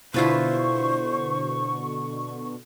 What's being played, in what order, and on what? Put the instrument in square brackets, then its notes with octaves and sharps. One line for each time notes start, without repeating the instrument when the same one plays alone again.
[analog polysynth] B2 D3 [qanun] E4 F4 B4 [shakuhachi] C5 [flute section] C#6